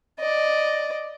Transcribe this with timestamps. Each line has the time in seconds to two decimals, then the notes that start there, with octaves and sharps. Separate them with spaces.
0.20 D5 D#5